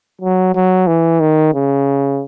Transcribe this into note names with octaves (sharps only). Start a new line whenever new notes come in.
F#3
F#3
E3
D#3
C#3